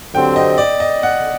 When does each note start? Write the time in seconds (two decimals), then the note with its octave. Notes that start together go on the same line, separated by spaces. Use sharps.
0.14 D3 F#3 C4 G4 G5
0.36 D#5
0.58 D5
0.80 D#5
1.03 F#5